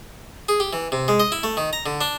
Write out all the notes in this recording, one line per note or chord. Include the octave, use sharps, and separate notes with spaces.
G#4
G4
E3
C3
G#3
D#5
E4
A3
D#3
A#5
D3
D4